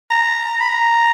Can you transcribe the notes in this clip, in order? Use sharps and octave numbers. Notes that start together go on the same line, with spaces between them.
A#5
B5
A#5